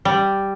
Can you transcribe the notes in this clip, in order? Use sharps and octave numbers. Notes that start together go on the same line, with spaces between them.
G3